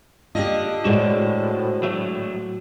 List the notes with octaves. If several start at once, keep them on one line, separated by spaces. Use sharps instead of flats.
D3 F4 G4 D#5
A2 G#3 F#4 C5 D5
F#3 A3